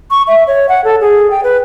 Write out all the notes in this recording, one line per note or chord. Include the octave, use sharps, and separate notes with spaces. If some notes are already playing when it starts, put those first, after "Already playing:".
C#6
E5
C#5
F#5
A4
G#4
G5
B4